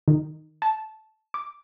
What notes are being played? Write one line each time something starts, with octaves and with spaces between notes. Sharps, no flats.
D#3
A5
D6